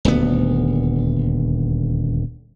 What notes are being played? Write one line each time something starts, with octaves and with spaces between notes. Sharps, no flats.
D#1 D2 B3